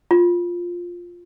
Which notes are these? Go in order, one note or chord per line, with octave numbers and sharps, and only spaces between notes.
F4